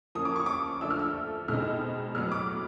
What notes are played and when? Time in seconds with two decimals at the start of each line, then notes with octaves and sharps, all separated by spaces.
0.15 F3 A#3 C#4 D#6
0.25 D6
0.36 C#6
0.46 D6
0.81 F3 A3 D4 E6
0.90 F6
0.99 E6
1.48 B2 G#3 C4 D#4 F6
2.15 A2 F#3 B3 F6
2.32 D6